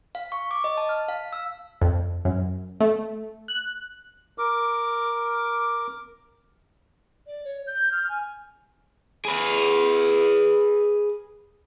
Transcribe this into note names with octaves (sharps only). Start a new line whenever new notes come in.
F5
C#6
D6
D#5
A5
F6
F5
E6
F2
F#2
A3
F#6
A#4 D6
D5
C#5
G6
F6
G#5
G#4 B4